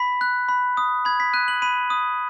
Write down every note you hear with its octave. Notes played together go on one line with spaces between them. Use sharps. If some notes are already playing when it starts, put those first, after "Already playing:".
Already playing: B5 B6
F#6
B5
D#6
B5 G#6
B6
F#6 D#7
F#7
B5 D#7
D#6